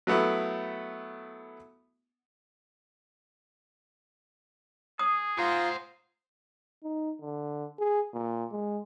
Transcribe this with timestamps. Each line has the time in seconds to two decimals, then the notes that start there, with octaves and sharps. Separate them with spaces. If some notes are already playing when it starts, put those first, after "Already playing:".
0.07 F#3 A3 B3 E4
4.99 G#4 D#6
5.38 F4 C5 F#5 A#5
6.84 D#4
7.21 D3
7.79 G#4
8.14 A#2
8.51 G#3